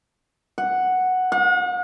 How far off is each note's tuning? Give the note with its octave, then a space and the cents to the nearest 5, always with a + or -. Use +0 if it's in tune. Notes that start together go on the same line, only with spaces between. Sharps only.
F#5 +0
F#5 -45